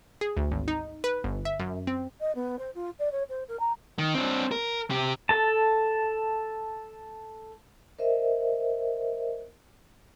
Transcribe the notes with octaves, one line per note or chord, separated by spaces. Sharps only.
G#4
D2
G#1
D#4
B4
G1
E5
F#2
C4
D#5
B3
C5
F4
D5
C#5
C5
A#4
A#5
D#3
C4 D4
A#4
C3 G4
A4 A5
A#4 C5 D#5 E5